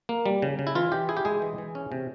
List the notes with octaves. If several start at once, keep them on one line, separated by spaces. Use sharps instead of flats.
A#3
G3
C#3
C#3
E4
E3 F4
E3 G4
E4 G#4
G4
G#3 G#4
E3
E3
C#4
C3